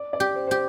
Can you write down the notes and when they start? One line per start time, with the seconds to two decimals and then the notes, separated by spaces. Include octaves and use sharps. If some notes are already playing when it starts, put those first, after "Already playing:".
Already playing: D5
0.13 D5
0.20 G4
0.36 C5
0.47 G4 C5